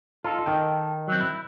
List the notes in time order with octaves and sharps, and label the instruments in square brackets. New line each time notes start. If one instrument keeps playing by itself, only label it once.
[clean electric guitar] D#4 A4 [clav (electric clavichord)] F4
[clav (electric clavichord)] D#3 G5
[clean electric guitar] F#3 C4
E4